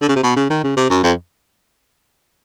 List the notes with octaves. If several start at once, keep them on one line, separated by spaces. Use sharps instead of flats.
D3
C#3
C3
B2
C#3
D#3
C#3
C3
F#2
F2